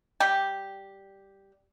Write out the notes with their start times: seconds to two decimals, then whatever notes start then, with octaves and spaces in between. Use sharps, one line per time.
0.20 G3 G4